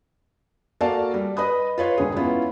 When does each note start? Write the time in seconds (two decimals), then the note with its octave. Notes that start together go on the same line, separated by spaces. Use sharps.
0.81 A#3 F#4 A4 D5 F5 A5
1.14 G3
1.37 B4 D#5 B5 D#6
1.78 F4 B4 C#5 C6
1.98 E1 G#4
2.16 B3 C#4 E4 F4